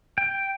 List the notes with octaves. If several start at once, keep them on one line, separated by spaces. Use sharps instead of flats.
G5